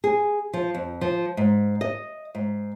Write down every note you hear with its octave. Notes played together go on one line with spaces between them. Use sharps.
G#4
F3
F2
F3
G#2
D#5
G#2